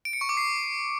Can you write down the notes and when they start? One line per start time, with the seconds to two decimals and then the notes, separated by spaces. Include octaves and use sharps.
0.05 D7
0.13 C#7
0.21 C#6
0.29 D6
0.37 C7